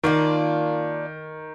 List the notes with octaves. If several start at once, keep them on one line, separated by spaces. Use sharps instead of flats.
D#3 A#3 D4 F4